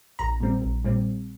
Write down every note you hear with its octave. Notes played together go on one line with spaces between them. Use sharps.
A#1 A#5
A#2 G3 C4
A#1
A#2 G3 C4